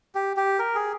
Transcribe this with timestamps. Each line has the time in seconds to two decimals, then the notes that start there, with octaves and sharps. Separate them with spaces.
0.15 G4
0.37 G4
0.59 A#4
0.75 G#4